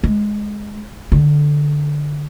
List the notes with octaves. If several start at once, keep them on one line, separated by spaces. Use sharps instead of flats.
G#3
D3